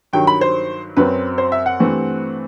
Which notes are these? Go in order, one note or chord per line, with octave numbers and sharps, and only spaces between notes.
G2 D#3 F#3 G5
B5
C5
F#2 F#3 C4 B4
C5
E5
F#5
G2 E3 A3 C4